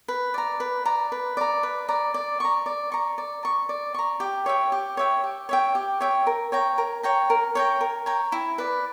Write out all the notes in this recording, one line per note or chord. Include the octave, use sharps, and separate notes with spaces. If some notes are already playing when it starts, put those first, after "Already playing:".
B4
D5 A#5
B4
D5 A#5
B4
D5 A#5
B4
D5 A#5
D5
A#5 C#6
D5
A#5 C#6
D5
A#5 C#6
D5
A#5 C#6
G4
C#5 E5 G5
G4
C#5 E5 G5
G4
C#5 E5 G5
G4
C#5 E5 G5
A#4
C#5 G5 A#5
A#4
C#5 G5 A#5
A#4
C#5 G5 A#5
A#4
C#5 G5 A#5
E4
B4 D5